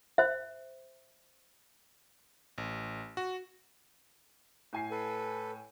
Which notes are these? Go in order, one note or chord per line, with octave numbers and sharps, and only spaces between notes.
C5 E5
A1
F#4
A2 G#5 C7
A4 B4